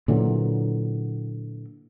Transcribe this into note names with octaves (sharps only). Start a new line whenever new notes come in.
A#2 D3 E3 F#3